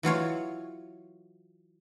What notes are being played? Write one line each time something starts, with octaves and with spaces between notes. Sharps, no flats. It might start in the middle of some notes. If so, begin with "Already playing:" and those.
E3 F#3 F4 C#5